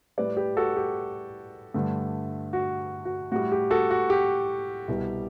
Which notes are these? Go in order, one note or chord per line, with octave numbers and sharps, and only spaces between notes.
A2 G3 B4 D5
G4 B4
F#4 A4
G4
G2 D3 A3
F#4
F#4
A2 G3 F#4
G4
F#4 A4
F#4
G4
C2 B2 G3